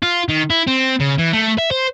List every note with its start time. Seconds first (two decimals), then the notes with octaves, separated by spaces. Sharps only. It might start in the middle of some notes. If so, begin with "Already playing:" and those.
0.02 F4
0.29 D#3
0.50 E4
0.67 C4
1.00 C#3
1.18 E3
1.33 A3
1.58 E5
1.71 C5